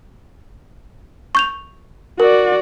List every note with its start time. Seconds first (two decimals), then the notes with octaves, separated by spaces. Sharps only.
1.35 C#6 G6 F7
2.20 F#4 A#4 D5